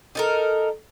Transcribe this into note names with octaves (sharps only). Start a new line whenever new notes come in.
D#4 A4 A#4